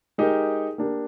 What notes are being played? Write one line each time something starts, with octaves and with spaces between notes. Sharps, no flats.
G#3 D#4 G4 A#4
A#3 D4 G4 A#4